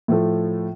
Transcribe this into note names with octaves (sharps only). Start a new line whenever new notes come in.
A2 F3 A3